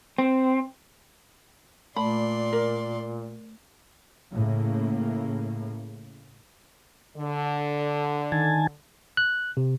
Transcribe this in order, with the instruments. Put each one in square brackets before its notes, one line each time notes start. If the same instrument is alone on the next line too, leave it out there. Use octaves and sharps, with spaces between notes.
[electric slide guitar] C4
[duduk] A#2 [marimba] A3 [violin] D5 C6 [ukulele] B5
[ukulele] A#4
[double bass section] A2 C#3 A#3
[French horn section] D3
[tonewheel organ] D#3 G#5 A5
[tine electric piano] F#6
C3